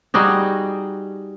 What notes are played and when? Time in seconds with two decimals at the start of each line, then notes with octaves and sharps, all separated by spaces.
0.14 G3 D#4 F#4 G#4